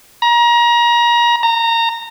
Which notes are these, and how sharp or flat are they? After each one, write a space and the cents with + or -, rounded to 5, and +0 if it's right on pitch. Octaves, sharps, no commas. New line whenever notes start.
A#5 +30
A#5 -20